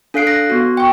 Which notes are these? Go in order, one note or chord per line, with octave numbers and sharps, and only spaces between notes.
D4 A4 F5 F#6 C7 D7
F#6 A#6
B3 F#4
G5 C#6